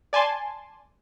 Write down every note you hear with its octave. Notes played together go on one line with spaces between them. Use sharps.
D5 G#5 A5 C6